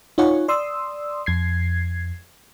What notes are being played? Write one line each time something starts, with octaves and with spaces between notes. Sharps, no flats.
D#4 F4 C#5 F#5 G#5 C#6
D5 C6 D#6 E6
F2 G#6 C7